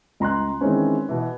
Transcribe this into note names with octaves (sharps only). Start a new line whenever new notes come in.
C#2 A#5 C6 F#6
D#3 E3 G#3 C4 C#4
B2 E3